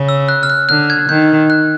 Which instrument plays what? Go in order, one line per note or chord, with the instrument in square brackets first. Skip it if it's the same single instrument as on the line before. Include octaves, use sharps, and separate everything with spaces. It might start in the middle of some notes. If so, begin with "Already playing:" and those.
Already playing: [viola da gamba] C#3
[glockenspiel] E6
F#6
F6
F#6
[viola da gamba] D3 [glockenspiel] F#6
[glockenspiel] G#6
[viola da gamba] D#3 [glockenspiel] G6
[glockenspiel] F#6